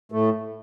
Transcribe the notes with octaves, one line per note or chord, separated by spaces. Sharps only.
A2 A3